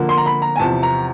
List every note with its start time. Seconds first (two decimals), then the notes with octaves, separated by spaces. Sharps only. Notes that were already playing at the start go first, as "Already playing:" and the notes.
Already playing: D3 F3 A#3
0.09 C6
0.18 A#5
0.26 B5
0.42 A#5
0.56 G#5
0.59 E2 C3 F3 A5
0.83 A#5